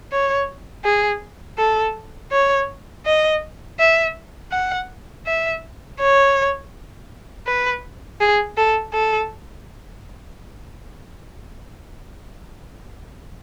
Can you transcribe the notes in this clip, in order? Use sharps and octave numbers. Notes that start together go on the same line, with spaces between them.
C#5
G#4
A4
C#5
D#5
E5
F#5
E5
C#5
B4
G#4
A4
A4